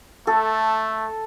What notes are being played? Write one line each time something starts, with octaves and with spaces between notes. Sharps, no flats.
A3 A4